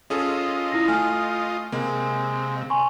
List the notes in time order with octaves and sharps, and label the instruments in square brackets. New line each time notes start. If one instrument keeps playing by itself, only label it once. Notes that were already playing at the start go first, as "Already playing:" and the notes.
[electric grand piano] C#4 G#4 A4 [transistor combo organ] F4 D#5
[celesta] E4 A#6
[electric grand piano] A3 [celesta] G#5 F6
[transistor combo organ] C3 [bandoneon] G#3 [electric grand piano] A#3
[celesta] G#5 C6 C#6